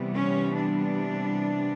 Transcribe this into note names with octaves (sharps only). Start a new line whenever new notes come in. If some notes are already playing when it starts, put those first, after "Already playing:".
Already playing: C3 E3 G3 B3
C#4
D4